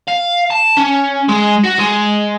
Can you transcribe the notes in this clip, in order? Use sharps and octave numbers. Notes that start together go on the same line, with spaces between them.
F5
A5
C#4
G#3
F#4
G#3